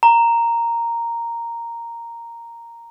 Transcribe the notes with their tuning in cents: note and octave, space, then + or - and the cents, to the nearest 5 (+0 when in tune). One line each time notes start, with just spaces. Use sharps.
A#5 -5